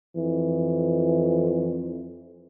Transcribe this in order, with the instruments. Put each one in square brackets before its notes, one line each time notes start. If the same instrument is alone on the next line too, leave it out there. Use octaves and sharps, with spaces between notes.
[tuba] F2 [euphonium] E3